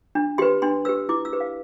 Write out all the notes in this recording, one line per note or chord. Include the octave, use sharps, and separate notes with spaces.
D4
G4 B4 C6
D4 C6
G4 B4 E6
E4 D6
E6
G4 B4
F5